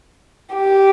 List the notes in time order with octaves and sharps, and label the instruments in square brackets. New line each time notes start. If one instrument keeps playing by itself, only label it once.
[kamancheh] G4